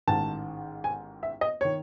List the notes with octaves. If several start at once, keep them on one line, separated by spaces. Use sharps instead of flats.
A1 G#2 D#3 A5
G#5
E5
D#5
D#3 C#5